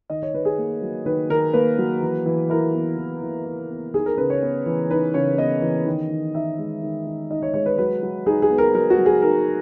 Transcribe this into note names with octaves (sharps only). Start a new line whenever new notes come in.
D#3 D#5
C#5
D#3 B4
G#4
A#3
F#3
D#3 B4
D#3 A#4
A#3 B4
F#3
E3
E3
E4 A#4
B3
E3
E3
E4
B3
D#4 G#4
A#4
C#3 B4
C#5
B3
E3
D#4 B4
C#3 C#5
B3 D#5
E3
D#3
D#3
D#4 E5
G#3
D#3
D#3
D#4 D#5
C#5
G#3 C#5
B4
F#3 B4
F#3
D#4 G#4
G#4
B3
A#4
F#3 A#4
F#4
F#3
G#4
D#4 A#4